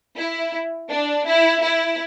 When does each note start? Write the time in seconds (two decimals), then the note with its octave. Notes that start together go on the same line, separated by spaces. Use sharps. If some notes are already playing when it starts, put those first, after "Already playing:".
0.17 E4
0.89 D4
1.26 E4
1.61 E4